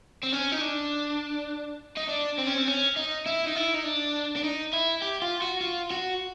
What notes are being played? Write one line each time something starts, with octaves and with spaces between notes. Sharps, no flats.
C4
C#4
D#4
D4
D#4
D4
C4
C#4
C4
C#4
D#4
E4
D#4
E4
D#4
D4
D4
D#4
E4
G4
F4
F#4
F4
F#4